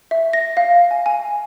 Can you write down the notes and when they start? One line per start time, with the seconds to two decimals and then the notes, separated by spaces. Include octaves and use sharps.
0.11 E5
0.33 A#6
0.57 F5
0.91 G#5
1.06 G#5